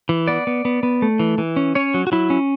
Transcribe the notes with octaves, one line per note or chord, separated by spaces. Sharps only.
E3
B3 D5
B3
B3
B3
A3
E3
E3
C#4
C#4 C#5
F#3
F#4
F#3 E4
C#4